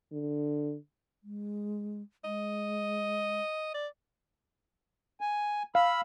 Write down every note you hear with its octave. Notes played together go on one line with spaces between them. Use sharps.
D3
G#3
G#3 D#5
D5
G#5
F5 B5 E6